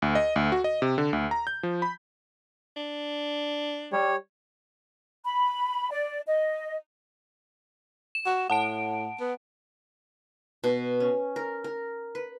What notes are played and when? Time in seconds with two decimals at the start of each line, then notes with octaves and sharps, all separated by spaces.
0.02 D2
0.15 D#5
0.36 D2
0.52 F#4
0.64 D#5
0.82 C3
0.98 D3
1.13 D2
1.31 A#5
1.47 G6
1.63 F3
1.82 B5
2.77 D4
3.93 G3 C#5
5.25 B5
5.91 D5
6.27 D#5
8.15 E7
8.26 F#4
8.50 A2 F#5 A5 D7
9.20 B3
10.64 B2
11.00 C#4
11.36 A#4
11.64 A#4
12.15 B4